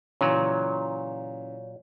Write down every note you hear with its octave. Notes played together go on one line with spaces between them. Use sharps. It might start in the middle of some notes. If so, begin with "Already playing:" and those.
A#2 C#3 E3 F#3 C#5